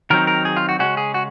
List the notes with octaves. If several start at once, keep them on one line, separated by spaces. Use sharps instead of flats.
D#3 F#3 C4 D#4 A#4
A#4
G#4
F4
F#4
C#3 G#3 C#4 F#4
G#4
F#4